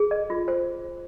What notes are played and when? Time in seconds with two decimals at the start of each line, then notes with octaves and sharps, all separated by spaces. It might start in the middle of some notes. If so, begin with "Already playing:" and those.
Already playing: G#4
0.11 D#5
0.30 F4
0.48 C5